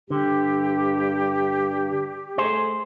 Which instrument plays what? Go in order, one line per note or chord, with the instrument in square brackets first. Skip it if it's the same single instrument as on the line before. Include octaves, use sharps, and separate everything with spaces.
[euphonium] G2 [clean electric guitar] D3 [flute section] G4
[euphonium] A3 [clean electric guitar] G#4 C5